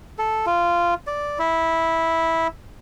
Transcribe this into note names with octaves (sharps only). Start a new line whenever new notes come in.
A4
F4
D5
E4